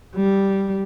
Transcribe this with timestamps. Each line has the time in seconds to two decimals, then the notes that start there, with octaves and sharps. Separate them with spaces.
0.15 G3